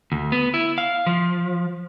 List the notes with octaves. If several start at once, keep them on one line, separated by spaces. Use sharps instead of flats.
D2
B3
E4
F5
F3